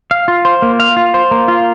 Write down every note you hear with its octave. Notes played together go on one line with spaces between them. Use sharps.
F5
F4
C5
A#3
F5
F4
C5
A#3
F4